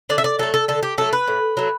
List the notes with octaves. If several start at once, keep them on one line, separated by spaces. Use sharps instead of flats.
D3 D5
E5
D5
F#3 A3 A4
A4
D3 A4
G4
F#3 A3 A4
B4
A2
F#3 A3